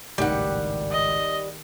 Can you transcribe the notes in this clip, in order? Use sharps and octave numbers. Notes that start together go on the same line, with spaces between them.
G#1 C#2 A2 D#3 G3 G4 F#5
D#5